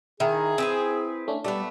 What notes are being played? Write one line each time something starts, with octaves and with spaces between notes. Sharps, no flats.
D#3 E4 G#4
C4 B4 G#5
A3 C#4 D4
G3 A3 B3 D5